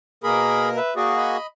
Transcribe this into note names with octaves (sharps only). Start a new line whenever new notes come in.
B2 A#3 G#4 A#4 B5
B4 E5
A#3 F#4 G#4 D5
D#5 B5